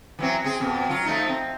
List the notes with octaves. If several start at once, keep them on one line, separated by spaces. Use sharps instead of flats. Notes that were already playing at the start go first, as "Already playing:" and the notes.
E3 F#3 C4
C4 G#4
F2 B2
F#3 F4
F3 A3 D#4
C4